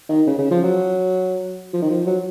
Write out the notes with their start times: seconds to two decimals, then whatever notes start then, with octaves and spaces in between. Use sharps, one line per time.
0.09 D#3
0.27 C#3
0.39 C#3
0.51 F3
0.64 F#3
1.73 F3
1.82 D#3
1.90 F3
2.06 F#3